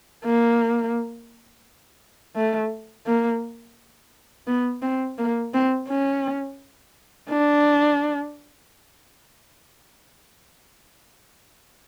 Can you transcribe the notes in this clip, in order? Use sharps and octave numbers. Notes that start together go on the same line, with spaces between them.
A#3
A3
A#3
B3
C4
A#3
C4
C#4
D4